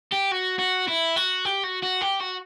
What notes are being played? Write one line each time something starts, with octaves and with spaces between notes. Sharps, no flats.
G4
F#4
F#4
E4
F#4
G4
F#4
F#4
G4
F#4